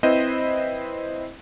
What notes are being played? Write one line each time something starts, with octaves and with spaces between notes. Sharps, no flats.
C4 E4 B4 C5 D#5